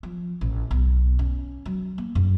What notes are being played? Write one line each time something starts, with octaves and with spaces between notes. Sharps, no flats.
F3
A1
B1
C#4
F#3
A#3
F#2